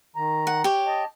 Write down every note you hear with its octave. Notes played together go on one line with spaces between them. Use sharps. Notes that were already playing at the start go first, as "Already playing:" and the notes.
D#3 A#5
F#5
G4 C#5
D#5 A5